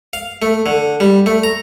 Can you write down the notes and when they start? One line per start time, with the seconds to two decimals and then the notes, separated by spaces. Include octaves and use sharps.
0.13 F5
0.42 A3
0.66 D3
1.00 G3
1.26 A3
1.44 A#5